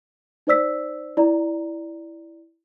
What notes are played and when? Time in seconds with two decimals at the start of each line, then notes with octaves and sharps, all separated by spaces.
0.47 D#4 C5 D5 E6 B6
1.17 E4 D5 A#5